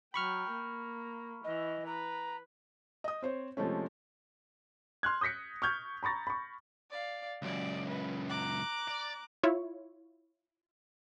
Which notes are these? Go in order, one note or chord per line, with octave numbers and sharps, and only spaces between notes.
F#3 G5 B5 C#6 F6
A#3
E3 D#5
B4 A#5
D#5 D#6
C4 C5 C#5
C3 F3 G#3 A3 C#4
C6 F6 F#6 G#6
D#6 G6 A#6 B6 C#7
C#6 F6 G6 G#6
A#5 B5 C#6 A6 A#6
B5 C#6
D5 F5
C#2 F#2 D5
B4
A#5 D6 F#6
D5
E4 F4 C#5